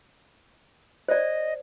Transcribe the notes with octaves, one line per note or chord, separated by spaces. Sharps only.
C5 D5 D#5